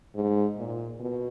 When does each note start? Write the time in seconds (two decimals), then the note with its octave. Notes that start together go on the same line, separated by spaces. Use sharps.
0.15 G#2
0.57 A#2
0.99 B2